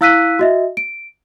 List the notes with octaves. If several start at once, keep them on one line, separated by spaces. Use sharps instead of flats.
E4 F5 E6 F#6 B6 D#7
F#4 D#5 E5
D7